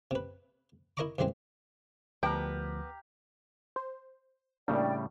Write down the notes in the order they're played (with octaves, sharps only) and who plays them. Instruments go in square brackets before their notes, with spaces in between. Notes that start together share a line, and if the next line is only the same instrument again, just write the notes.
[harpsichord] C3 B4
E4 A#4 D#5 A#5 C#6 D6
G2 D#3 E3 G#3 C4
[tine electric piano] D2 F3 [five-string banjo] B3 G5 A5 [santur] G4 A#4
[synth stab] C5
[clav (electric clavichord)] A2 C#3 G3 [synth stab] A#3 D4 [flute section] D5 G5